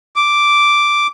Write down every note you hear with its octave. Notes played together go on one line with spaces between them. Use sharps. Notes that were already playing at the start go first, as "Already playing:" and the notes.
D6